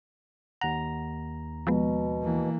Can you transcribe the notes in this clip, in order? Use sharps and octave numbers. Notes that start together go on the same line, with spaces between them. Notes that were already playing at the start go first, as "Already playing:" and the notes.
D#2 F#5 A#5
B2 F3 G#3 B3
E3 A#3